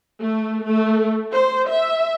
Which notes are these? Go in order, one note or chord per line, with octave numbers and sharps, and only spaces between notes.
A3
A3
C5
E5